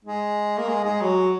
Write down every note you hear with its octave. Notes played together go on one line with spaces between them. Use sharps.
G#3
A#3
G#3
G#3
F#3